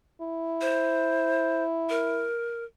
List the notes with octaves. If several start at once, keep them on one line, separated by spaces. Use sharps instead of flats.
E4
C5
A#4